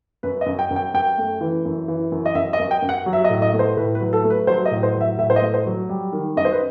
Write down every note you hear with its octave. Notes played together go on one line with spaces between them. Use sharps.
F#2 B4
D#5
F#2
G5
F#2
G5
F#2 G5
A3
E3
F#2
E3
F#2
D#5
F#2 E5
D#5
F#2
G5
F#2
F#5
F#3
E5
D#5
A2
D#5
A3
C5
A2 B4
B4
F#3
A4
A3
B4
F#3 C5
D#5
A2
C5
F#3
E5
A2 E5
C5
D#5
A3
C5
F#3
G3
D#3
F#2 D#5
C5
B4